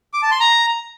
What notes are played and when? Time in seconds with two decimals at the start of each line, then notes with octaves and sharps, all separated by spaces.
0.14 D6
0.22 A5
0.31 C6
0.40 A#5